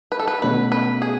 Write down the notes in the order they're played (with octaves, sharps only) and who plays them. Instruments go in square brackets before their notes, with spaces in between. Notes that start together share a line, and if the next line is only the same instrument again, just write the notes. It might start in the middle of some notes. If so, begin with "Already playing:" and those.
[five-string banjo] B4
A4
B4
[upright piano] B2 A3 C#4 F#4 [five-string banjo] B4
[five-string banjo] B4
G#4